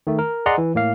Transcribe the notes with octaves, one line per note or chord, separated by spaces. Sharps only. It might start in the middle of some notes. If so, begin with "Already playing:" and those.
D#3 A3
A#4
G#4 D5 D#5 F#5 A#5 C6
E3
A2 A#3 F5